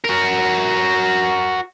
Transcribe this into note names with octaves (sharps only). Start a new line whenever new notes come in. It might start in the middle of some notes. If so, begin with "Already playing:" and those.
F#4 A#4